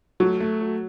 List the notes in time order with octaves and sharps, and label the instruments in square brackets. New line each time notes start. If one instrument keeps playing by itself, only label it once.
[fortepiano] F#3 [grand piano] A3
[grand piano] A3
F#3